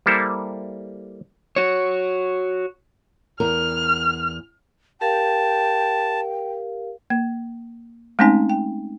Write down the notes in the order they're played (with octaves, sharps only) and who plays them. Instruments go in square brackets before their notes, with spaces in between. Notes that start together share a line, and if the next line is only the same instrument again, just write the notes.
[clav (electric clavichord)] G3 A#3 E4 A4 C5
[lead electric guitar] F#4 C#5
[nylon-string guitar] E2 A#4 [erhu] F6
[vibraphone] G4 A#4 F5 [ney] G5 [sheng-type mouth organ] A5
[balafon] A#3
G#3 A3 C4 C#4 D#4 G#5
G5